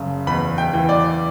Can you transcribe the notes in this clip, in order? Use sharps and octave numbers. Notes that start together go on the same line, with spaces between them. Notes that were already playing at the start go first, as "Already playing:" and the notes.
Already playing: F#1 C#3
E2 B5
G5
E3
D5